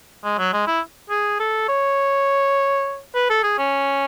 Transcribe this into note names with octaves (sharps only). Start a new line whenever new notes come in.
G#3
F#3
G#3
E4
G#4
A4
C#5
B4
A4
G#4
C#4